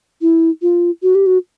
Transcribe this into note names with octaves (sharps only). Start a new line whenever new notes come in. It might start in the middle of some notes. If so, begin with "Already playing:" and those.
E4
F4
F#4
G4
F#4